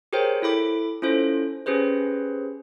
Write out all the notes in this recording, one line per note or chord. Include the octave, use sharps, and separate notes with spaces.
G4 G#4 A#4 C5 C#5 G5
E4 A4 B5 D6
C#4 E4 F4 A4 C5
C#4 G4 G#4 B4 C5